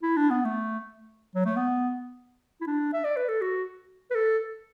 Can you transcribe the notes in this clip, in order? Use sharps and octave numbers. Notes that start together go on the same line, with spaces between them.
E4
D4
B3
A3
F#3
A3
B3
E4
D4
E5
D5
B4
A4
F#4
B4
A4